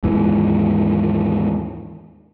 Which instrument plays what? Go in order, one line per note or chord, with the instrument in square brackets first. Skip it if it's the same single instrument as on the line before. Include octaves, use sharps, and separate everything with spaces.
[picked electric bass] D#2 G#2 E3